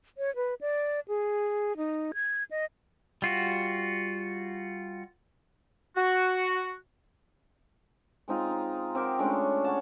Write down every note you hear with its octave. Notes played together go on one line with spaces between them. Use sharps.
C#5
B4
D5
G#4
D#4
G#6
D#5
G3 F4 F#4
F#4
G#3 C4 D#4 F4
D#4
C4 G4 A#4
G#3 A3 C#4 D4
C#5 F#5 A5